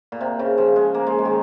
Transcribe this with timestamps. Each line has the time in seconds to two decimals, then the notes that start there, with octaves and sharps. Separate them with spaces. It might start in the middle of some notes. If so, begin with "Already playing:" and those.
0.12 A#2
0.21 C3
0.39 C#3
0.58 F3
0.76 G#3
0.94 A#3
1.07 G#3
1.19 G#3
1.25 D#3